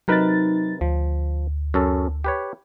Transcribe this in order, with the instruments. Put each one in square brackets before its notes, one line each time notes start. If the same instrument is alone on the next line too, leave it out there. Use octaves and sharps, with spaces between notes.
[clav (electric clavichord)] C3 A#4 B4 [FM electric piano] F#3 D#4 A6
[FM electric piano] D2 [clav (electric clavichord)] F3
[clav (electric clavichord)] F#2 C#4 A4
G4 B4 C#5